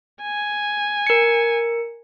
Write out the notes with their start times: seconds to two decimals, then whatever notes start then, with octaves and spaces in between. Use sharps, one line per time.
0.23 G#5
1.07 A#4 C#7